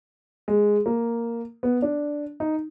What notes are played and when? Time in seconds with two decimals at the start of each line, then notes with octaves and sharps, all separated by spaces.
0.48 G#3
0.86 A#3
1.63 B3
1.82 D4
2.40 D#4